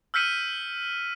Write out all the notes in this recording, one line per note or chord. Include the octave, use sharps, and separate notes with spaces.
E6 F6 G6 B6 C#7 D#7